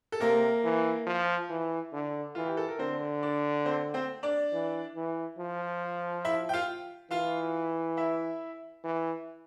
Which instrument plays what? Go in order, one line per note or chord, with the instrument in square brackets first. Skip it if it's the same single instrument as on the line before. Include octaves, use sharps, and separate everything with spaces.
[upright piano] A4
[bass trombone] C3 [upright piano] A#3 A#4
[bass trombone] E3
F3
E3
D3
[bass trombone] E3 [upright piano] F4
[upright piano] G4
A4
A#4
[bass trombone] D3 [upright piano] C4 C5
[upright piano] D4 D5
C4 C5
C4 C5
D4 D5
[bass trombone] E3
E3
F3
[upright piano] E4 E5
G5
F4 F5
[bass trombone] E3 [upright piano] F4 F5
[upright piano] E4 E5
[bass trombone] E3